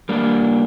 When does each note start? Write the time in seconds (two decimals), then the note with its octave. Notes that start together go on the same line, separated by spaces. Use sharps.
0.09 G3 A#3 D4